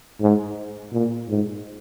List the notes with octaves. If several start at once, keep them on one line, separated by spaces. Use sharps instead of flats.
G#2
A#2
G#2